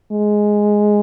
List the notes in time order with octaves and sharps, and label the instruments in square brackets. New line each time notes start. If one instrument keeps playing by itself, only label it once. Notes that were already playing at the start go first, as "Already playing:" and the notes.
[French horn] G#3